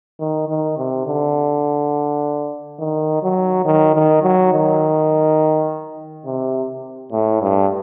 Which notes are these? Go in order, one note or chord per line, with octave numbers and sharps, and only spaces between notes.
D#3
D#3
C3
D3
D#3
F#3
D#3
D#3
F#3
D#3
C3
A2
G2